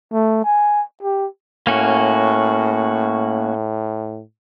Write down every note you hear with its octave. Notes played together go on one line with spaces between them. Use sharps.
A3
G#5
G4
A2 A#3 C#4 F#4